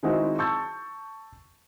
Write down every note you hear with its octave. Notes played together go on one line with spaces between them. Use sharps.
D#3 G#3 C4 D#4 E4 F#4
A5 C#6 E6 G6 A6